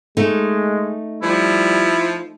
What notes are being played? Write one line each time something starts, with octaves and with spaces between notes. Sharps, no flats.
G#3 A3 D#4
F3 G3 E4